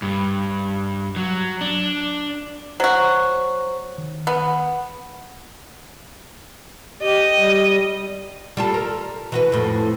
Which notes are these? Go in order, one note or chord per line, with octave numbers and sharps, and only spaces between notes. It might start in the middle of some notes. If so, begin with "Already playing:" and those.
G2
F#3
D4
F#3 F#4 C5
D#3
B3 F#5
G4 D#5
G3
G3 F4 A4
A#4
E3 F#4 B4
F2 A2